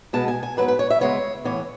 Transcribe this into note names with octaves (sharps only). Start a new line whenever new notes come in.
B2 G#3 B3 A5
G#5
G#5
G#2 F#3 B3 B4
B4
C#5
E5
C#3 E3 G#3 B3 C#5
A2 E3 B3 C#5